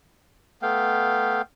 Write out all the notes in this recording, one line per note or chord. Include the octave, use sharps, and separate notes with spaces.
A3 B3 F5 G5